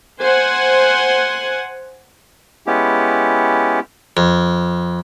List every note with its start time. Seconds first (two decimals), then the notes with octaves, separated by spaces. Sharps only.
0.21 C5 F#5 G#5
2.67 G#3 B3 C#4 E4 G4
4.17 F2